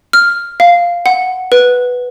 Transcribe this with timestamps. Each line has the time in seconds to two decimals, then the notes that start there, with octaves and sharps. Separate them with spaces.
0.13 F6
0.60 F5
1.06 F#5
1.52 B4